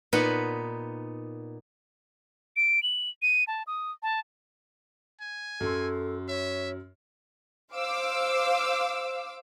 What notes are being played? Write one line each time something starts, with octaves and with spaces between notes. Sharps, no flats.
A#2 B3 D#4 F#5 B5
D7
F#7
D#7
A5
D#6
A5
G#5
F#2 A4 C6
C#5 E5
C5 F5 D6 E6